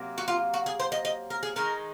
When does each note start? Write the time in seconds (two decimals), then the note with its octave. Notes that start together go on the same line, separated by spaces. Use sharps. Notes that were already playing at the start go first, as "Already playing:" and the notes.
Already playing: C3 F#3 A#3
0.18 F#4
0.28 F4
0.54 F#4
0.66 G#4
0.80 C5
0.92 D#5
1.05 D#5
1.30 A#4
1.43 G#4
1.56 D#3 G#3 D#4 A#4